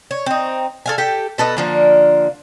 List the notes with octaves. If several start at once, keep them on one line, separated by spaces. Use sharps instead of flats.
C#5
C4 D#4
A4 F5 G#5
G4 A4 G5
B2 A4 B4 D#5
D3 F3 A#3